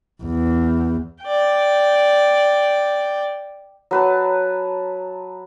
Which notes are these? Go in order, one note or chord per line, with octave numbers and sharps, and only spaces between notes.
E2
D5 G5
F#3 B4 A5